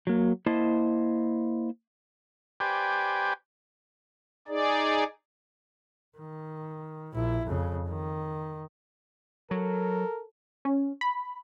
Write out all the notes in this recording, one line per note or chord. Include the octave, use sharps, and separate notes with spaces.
F#3 A#3
A#3 E4 C5 D#5 A5
G4 B4 C5 D5 G5 G#5
D#4 G#4 D5
D#3
A#1 E4
F2 C#3
D#3
F#3 A4 A#4
C#4
B5